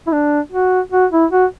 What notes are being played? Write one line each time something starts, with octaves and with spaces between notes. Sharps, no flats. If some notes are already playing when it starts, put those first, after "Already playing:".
E4
D4
F#4
F#4
E4
F#4